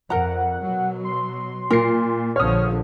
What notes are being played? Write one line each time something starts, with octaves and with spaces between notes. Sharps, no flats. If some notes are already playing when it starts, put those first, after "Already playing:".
F2 A#4 F#5 A#5
B2 F#3
C6
A#2 F4 A#4 C7
A#1 D3 F3 C#5 D#6 F6